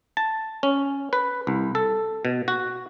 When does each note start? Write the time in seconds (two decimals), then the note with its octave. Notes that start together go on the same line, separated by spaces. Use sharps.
0.17 A5
0.63 C#4
1.13 B4
1.47 C2
1.75 A4
2.25 B2
2.48 F#4